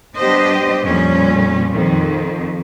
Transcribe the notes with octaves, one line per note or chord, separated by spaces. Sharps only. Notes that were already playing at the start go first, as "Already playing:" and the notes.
G3 B3 D4 G4 C5 D#5
F2 A#2 G3 C#4
F2 D#3